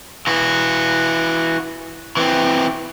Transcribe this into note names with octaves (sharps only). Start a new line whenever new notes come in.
E3 F#4
E3 C4